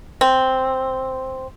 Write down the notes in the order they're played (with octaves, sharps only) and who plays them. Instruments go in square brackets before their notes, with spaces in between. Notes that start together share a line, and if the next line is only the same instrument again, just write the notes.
[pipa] C4